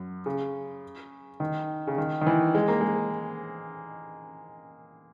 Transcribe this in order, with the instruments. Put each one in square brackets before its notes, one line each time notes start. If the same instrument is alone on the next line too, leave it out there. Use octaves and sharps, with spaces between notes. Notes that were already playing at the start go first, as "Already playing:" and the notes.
Already playing: [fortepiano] F#2
C#3
D#3
C#3
D#3
D#3
E3
G#3
A#3
G#3